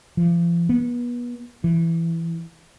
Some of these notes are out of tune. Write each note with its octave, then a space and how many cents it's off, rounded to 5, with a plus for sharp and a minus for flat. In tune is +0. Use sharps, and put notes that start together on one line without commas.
F3 -40
B3 -30
E3 +10